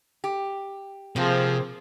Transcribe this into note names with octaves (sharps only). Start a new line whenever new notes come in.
G4
C3 F3 A#3 C4 G#4 C5